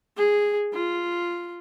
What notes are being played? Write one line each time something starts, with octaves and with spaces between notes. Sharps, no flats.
G#4
F4